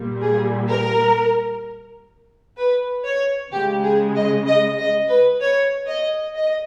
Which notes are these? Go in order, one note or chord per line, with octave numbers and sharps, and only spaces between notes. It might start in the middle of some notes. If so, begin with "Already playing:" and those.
Already playing: A#2 G3
G#4
A#4
B4
C#5
C#3 G#3 G4
G#4
D#5
D#5
D#5
B4
C#5
D#5
D#5